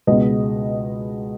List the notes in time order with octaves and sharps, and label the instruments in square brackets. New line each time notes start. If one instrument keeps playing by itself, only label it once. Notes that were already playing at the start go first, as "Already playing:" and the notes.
[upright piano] C#2 B2 G#3 B3 D#5